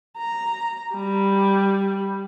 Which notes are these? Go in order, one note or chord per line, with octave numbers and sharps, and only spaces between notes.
A#5
G3